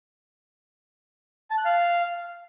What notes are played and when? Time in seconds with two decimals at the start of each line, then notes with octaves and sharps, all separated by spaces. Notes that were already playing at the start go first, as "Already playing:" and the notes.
1.50 A5
1.58 F#6
1.65 F5